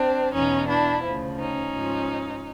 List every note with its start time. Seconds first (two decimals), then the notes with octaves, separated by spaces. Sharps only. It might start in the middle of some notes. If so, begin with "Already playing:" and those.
Already playing: C4 D4
0.32 E2 B2 C#4 D#4
0.67 D4 E4
1.03 D2 C#3 F3
1.38 C#4 D#4
1.74 G#2 F3